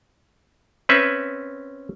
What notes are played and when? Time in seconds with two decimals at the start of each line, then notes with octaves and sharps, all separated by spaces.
0.89 C4 C#4 B4 E5